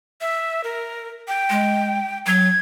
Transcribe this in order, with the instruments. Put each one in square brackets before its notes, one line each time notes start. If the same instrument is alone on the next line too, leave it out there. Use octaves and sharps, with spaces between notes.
[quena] E5
A#4
G5
[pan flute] G#3
[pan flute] F#3 [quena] G#6